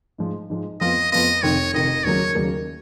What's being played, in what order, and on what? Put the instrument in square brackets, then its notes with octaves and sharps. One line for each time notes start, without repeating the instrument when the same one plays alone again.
[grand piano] G#2 F3 G#3
G#2 F3 G#3
[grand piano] F2 F3 B3 F4 [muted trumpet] D#5
[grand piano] F2 F3 B3 F4 [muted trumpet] D#5
[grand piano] F1 F2 D#3 [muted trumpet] C#5
[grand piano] F1 F2 D#3 [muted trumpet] D#5
[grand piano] D#2 C#3 F#3 A#3 [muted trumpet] C#5
[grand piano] D#2 C#3 F#3 A#3